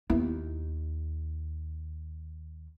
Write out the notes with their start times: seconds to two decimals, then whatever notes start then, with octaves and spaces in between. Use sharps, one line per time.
0.10 D#2 A#3 B3 E4